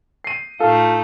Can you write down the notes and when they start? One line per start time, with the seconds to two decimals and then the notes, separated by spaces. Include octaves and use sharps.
0.24 C7 D#7
0.60 A2 A3 D#4 F4 A4 F5